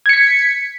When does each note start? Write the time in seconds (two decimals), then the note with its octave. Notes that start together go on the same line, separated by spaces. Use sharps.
0.06 G#6
0.09 C#7
0.13 B6